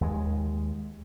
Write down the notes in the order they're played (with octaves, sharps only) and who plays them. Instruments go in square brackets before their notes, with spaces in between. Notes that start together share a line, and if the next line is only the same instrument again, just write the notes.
[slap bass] D#2 G#3